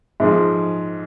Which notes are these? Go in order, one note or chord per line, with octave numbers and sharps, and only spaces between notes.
G#2 F3 G#3